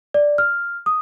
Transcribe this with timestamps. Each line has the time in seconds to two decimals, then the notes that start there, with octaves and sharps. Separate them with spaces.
0.14 D5
0.38 F6
0.86 D#6